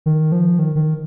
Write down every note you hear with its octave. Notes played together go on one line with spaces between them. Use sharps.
D#3
F3
D#3
D#3